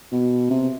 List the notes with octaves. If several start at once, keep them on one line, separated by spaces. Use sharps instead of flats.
B2
C3